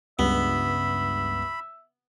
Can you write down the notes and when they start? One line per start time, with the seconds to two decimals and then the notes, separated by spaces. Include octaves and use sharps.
0.19 C#2 G2 B3 E5 B5